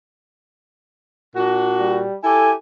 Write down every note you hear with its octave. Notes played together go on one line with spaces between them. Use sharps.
A#2 D4 F#4
G3
E4 G4 A4 G#5